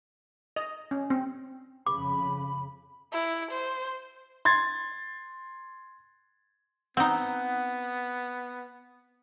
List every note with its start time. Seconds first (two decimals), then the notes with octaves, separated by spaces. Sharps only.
0.56 D#5
0.91 C#4
1.10 C4
1.86 F2 C#3 B5 D6
3.12 E4
3.52 C5
4.45 C6 G#6 A6
6.97 B3 C4 D#4 F#5